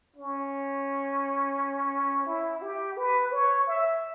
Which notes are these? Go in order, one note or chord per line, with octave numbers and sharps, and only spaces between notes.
C#4
E4
G4
B4
C#5
E5